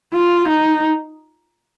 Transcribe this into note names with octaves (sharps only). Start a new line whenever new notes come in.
F4
D#4